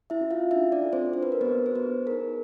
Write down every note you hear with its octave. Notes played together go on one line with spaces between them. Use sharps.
E4 E5
C#4 F#4
F4 F5
D4 E4 E5
D4 D5
F4 A4
C4 C5
D4 C5
B4
A#4
B3 F#4 A4 B4
C5
B3 B4
D#4 G#4 A#4